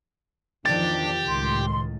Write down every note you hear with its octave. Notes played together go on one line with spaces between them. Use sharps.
E2 D#3 F3 D4 G4 A6
C#2 A2 D#3 C6